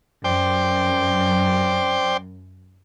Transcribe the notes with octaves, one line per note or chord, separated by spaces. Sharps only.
F#2 C5 D5 G5